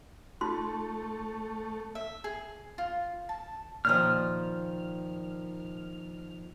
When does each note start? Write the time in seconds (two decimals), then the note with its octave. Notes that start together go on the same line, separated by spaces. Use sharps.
0.41 A3 D#4 F4 C6
1.95 E5
2.24 G#4
2.78 F4
3.29 A5
3.85 A#2 D#3 F3 F6